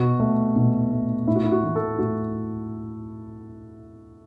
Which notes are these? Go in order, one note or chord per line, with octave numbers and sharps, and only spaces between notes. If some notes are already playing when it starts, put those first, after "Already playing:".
Already playing: B2 F#4
A3
B2
A3
A2 E4
F#4
E4
F#4
E3 A3
A4
A2 F#4